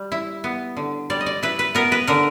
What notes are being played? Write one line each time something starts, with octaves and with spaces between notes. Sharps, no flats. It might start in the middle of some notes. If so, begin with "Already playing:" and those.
Already playing: G3
E4
B3
D3
G3 D5
D#5
D5
E4 B4
B4
B3 A#4
B4
D3 A#4